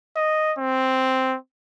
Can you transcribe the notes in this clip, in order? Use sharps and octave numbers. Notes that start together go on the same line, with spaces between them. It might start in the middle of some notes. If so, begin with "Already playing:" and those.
D#5
C4